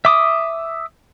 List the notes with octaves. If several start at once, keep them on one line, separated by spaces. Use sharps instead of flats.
E5 D6 D#6